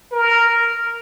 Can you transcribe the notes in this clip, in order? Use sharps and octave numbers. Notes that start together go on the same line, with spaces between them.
A#4